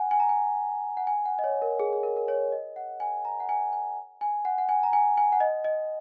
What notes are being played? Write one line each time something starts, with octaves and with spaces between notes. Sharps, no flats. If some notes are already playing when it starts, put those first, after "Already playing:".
Already playing: F#5 G#5
G#5
A#5
G#5
F#5
G#5
F#5
D#5
C#5
A#4
G#4
G#4
A#4
A#4
C#5
D#5
F#5
G#5
A#5
F#5
G#5
G#5
G#5
F#5
F#5
G#5
A#5
G#5
G#5
F#5
D#5
D#5